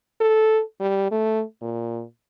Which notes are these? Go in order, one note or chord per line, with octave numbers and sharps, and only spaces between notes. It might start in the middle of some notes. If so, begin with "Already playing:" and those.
A4
G3
A3
A#2